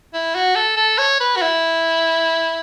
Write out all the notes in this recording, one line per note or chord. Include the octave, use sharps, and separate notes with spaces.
E4
F#4
A4
A4
C#5
B4
F#4
E4